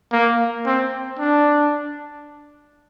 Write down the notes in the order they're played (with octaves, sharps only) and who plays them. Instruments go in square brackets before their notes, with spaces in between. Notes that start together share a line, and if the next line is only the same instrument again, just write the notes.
[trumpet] A#3
C4
D4